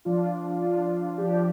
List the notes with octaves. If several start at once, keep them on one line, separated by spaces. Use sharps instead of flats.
F3 D4 F4
F3 D4 F4
F3 D4 G4